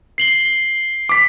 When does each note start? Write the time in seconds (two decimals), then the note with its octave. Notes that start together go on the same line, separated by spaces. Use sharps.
0.18 C7 F#7 G7
1.09 D6 B6